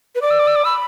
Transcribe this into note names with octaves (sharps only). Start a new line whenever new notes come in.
B4
D5 D6
E6
D6
E6
D6
B5 E6